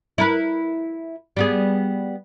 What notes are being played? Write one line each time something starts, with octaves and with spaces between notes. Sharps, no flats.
E4 A#4 B4
G3 B3 G#4